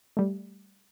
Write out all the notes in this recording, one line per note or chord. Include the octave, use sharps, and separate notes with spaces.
G3 A3